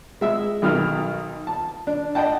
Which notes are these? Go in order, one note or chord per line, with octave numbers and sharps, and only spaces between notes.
G#3 E5 E6
B1 B2 D#3 F6
A5
D4
D5 D#5 F#5 G5 A5